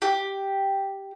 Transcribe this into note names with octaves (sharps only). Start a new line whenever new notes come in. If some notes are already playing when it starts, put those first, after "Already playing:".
G4